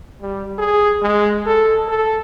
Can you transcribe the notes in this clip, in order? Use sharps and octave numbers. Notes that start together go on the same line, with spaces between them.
G3
G#4
G#3
A4
A4